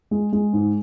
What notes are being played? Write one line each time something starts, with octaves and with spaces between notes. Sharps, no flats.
G#3
G#3
G#2